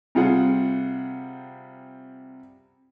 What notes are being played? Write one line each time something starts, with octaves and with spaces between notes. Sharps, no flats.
C3 G3 F4 G#4 F#5